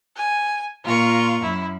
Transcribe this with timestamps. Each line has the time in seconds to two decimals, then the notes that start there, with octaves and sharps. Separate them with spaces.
0.16 G#5
0.85 A#2 F4 A#4 C#6
1.43 F#2 E4